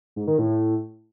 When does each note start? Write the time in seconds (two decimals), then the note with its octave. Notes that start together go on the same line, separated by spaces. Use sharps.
0.16 G#2
0.27 D#3
0.39 A2